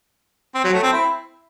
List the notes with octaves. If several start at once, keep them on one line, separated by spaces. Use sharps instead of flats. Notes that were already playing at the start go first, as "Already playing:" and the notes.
C4
F#3
A3
C4
E4